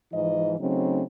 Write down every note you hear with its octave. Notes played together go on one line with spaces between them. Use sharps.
G#2 E3 F3 D#4 D#5
C#3 F#3 A3 C4 D#4